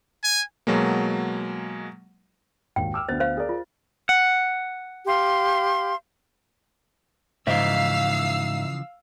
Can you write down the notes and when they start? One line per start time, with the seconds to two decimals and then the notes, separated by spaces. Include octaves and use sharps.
0.24 G#5
0.67 B2 F#3 G#3 A#3
2.76 G#1 D#2 G5
2.94 D6 E6 F6
3.09 D2 B3 C5 A6
3.20 C5 F5
3.37 G#4 A#4 D5
3.49 F4
4.09 F#5
5.06 G4 F5 C6
7.47 G#2 C#3 E3 F3 E5 F5 E6 C7